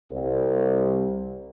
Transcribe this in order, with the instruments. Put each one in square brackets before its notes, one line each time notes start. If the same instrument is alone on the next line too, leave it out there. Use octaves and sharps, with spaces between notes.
[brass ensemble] C2